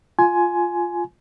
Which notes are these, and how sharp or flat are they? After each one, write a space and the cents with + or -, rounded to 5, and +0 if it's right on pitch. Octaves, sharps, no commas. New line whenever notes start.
F4 +0 G#5 +15 C6 +0